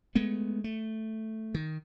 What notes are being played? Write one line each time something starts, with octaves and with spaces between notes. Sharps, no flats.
G#3 A3 B3
A3
D#3